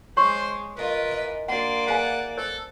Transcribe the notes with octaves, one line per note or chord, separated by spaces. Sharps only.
G#3 C5 C#5 C6 C#6
D#3 F4 A#4 B4 D#5
E3 D#5
A#3 D4 F#4 D5 F#5 C6
E4 G#4 B4 F5 F#5 G#5
A4 C5